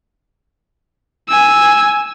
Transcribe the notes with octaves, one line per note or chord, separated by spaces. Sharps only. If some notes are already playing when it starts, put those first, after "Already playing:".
G#5 E6